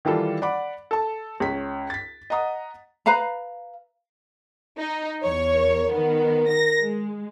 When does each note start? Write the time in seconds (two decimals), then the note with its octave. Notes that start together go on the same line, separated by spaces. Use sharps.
0.05 D#3 E3 G3 F4 A4
0.42 D5 F#5 B5 D6
0.91 A4 A5
1.40 C#2 C#4 B6
1.90 A6 B6
2.30 D#5 F#5 A#5 D#6
3.06 B4 F5 A#5 B5
4.77 D#4
5.24 E2 C#5
5.55 A#4
5.92 D#3 B3
6.49 A#6
6.79 G#3